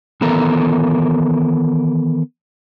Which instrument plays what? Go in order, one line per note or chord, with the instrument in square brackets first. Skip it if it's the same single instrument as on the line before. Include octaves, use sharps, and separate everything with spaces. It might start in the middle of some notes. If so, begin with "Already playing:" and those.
[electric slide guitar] D#3 E3 B3 A4 A#4 A#5